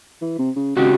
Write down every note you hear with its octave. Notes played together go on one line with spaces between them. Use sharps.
E3
C3
C#3
G#1 C#3 F#4 G4